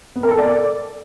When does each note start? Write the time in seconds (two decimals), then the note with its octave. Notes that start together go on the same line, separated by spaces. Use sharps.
0.16 B3
0.23 A#4
0.31 A4
0.38 D5